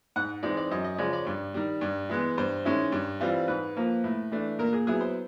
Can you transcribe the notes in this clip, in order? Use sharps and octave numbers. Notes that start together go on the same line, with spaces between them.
G#2 F#5
E3 G#3 C4 D#4 D5
D5
F#2 D#5
D#5
C#3 F3 G#3 C#4 D5
D5
G2
D#3 G3
G2
E3 G#3 B3
G2 C5
D#3 G#3 C#4 E4
G2
E3 G3 C4 F4
G#2 B4
F3 A#3
A2
E3 A3 D4
A#2 A#4
G#4
F#3 B3 E4 G#4
C5